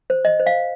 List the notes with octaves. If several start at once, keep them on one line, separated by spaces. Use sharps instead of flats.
C5
D#5
C5
F5